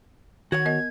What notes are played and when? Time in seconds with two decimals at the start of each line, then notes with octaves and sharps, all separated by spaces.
0.52 D#3 F#4 C#5 F#5 G#6
0.65 B3 A#4 D#5